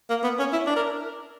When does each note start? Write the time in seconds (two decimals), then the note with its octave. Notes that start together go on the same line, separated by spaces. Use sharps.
0.10 A#3
0.23 B3
0.39 C#4
0.53 E4
0.67 D4
0.76 A#4